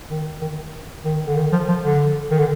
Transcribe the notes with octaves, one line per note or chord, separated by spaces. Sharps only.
D#3
D#3
D#3
D3
D#3
F3
F3
D3
D#3
D3